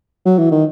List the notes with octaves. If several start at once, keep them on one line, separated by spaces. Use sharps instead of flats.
F#3
E3
D#3